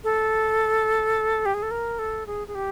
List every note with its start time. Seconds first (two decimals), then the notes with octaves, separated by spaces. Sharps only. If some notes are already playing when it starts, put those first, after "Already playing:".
0.04 A4
1.46 G4
1.54 G#4
1.62 A4
1.71 A#4
1.99 A4
2.27 G#4
2.48 G#4
2.55 G4